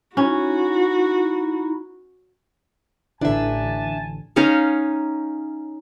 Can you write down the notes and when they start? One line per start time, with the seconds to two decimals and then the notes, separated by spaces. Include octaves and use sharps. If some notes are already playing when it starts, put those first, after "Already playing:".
0.17 C#4 D#4 E4 F#4
3.21 A1 D3 E3 D4 E5 G#5 A5
4.36 C#4 D#4 C#5 F5